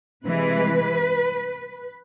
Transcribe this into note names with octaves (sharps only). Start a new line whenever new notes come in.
C3 E3 G#3 B4